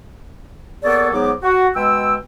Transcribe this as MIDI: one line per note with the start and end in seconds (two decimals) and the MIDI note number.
0.84 1.12 58
0.84 1.12 59
0.84 1.12 68
0.84 1.12 69
0.84 1.12 73
0.84 1.12 74
1.13 1.32 44
1.13 1.32 54
1.13 1.32 59
1.13 1.32 86
1.42 1.68 66
1.75 2.15 47
1.75 2.15 56
1.75 2.15 79
1.75 2.15 88